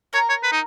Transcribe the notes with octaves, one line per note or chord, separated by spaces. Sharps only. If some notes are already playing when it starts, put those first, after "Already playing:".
A#4 C#5 A#5
C#5
B4
D#4